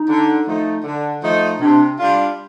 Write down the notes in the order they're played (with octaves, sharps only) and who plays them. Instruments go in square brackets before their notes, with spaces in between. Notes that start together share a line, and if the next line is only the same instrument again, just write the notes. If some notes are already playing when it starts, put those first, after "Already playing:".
Already playing: [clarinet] D#4
[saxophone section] D3
F3 A3 D#4
D3
F3 A3 D#4
[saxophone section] C3 [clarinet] D4
[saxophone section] G3 D4 F4